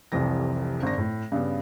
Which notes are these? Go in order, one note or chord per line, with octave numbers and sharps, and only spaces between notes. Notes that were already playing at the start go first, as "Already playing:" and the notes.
F1 C2 F2 E3 A#6
G#1 D3 A#6
A2
G2 C#3 B3